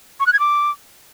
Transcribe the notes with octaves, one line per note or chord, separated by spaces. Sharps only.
C#6
F#6
G#6
D6